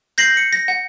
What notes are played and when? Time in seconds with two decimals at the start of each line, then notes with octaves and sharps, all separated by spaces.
0.18 G6 A#6 C7 F#7
0.37 C#7
0.53 A#6
0.68 F#5